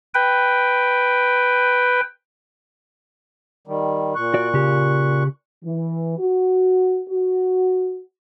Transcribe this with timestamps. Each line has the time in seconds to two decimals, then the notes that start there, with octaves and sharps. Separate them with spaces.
0.14 B4 G5
3.67 D#3 G3
4.15 A#2 C#6 F#6
4.34 F#4 D5
4.54 C#3 G4
5.65 E3
6.19 F#4
7.09 F#4